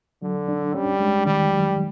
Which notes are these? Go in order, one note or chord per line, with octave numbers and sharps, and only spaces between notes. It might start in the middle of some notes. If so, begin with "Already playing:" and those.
D3 F#3
D4
G3 C#4
G#3
D#3 G3
F#3